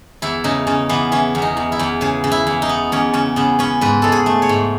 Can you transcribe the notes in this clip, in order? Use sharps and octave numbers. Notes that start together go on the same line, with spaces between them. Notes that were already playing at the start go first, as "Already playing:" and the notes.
E2 E4
C#3 D#4
C#3 C#4
E3 B3
E3 C#4
E2
D#4
E2
E4
E2
C#3 G#4
C#3
E4
E2
D#4
B3
E2 C#4
C#3 C#4
C#3 B3
B3 C#4
G#2 B4
G#2 A4
G#4
A3
C#5
G#2